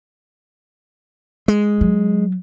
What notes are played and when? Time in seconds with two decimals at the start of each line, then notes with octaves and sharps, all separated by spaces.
1.48 G#3
1.81 F#3